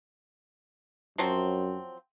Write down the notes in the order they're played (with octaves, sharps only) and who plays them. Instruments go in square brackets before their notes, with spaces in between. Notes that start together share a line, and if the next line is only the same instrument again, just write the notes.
[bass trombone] F#2 [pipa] F3 F#3 C4